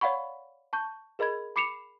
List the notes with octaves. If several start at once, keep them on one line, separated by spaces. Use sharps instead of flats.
C#5 D5 F5 F#5 B5 C#6
A5 C#6 G6
G#4 A#4 D#5 B5 G#6
B5 D6 C7 C#7 E7 F7